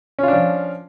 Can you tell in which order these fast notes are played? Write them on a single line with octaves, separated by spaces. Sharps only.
C#4 F4 D4 F3